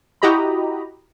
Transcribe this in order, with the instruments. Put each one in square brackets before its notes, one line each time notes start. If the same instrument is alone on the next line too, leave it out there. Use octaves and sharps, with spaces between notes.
[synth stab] E4 F#4 G4 D#5 A#5 B5